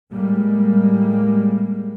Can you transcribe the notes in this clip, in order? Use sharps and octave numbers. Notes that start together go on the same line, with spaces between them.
A2 G3 G#3 A#3